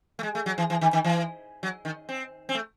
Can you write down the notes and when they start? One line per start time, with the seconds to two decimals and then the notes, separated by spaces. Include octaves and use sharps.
0.19 A3
0.23 G#3
0.35 A3
0.46 F#3
0.58 E3
0.70 E3
0.81 D#3
0.93 D#3
1.04 E3
1.63 F#3
1.85 D#3
2.09 C4
2.49 C4
2.55 A3